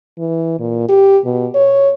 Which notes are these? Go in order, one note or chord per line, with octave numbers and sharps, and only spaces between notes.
E3
A#2
G4
B2
C#5